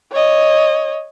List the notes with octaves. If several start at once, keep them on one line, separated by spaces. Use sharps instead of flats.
C#5 D#5